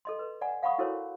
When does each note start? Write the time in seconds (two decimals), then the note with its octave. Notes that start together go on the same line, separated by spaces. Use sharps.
0.05 A4 D#5 C6
0.19 B4
0.41 D5 F#5 G#5 A#5
0.63 F5 F#5 A#5 B5 C#6 D#6
0.78 E4 F#4 A4 A#4 C5 C#5